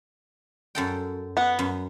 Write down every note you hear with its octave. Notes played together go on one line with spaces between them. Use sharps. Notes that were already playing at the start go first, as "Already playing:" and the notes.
F#2 A4 G5
B3 F#5
F#2